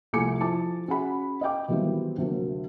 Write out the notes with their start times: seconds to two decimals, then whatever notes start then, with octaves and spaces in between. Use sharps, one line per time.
0.13 C2 F3 A3 G#5 D6 C#7
0.40 F3 E4 A5 D6
0.88 C#4 F#4 G#4 F#5 B5
1.41 D#5 F5 G5 D6
1.68 D#3 E3 F#3 G3 B3 C4
2.18 D2 C3 F#3 A#3